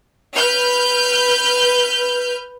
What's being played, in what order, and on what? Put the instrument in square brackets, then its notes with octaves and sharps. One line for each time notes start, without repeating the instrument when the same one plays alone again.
[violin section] B4 F6 G6